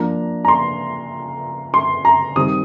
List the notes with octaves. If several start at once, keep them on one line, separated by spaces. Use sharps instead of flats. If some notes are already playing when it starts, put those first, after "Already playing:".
Already playing: F3 A#3 D4 A#5
A#5
C6
C6
A#5
D#3 G3 C4 D#6